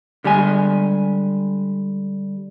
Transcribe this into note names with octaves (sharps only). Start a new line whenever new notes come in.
D3 G3 G#3 G#5